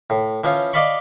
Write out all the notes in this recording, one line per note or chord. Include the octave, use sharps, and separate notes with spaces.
A2
E3 F3 C#4 F4
D5 D#5 F5 A5 B5 C#6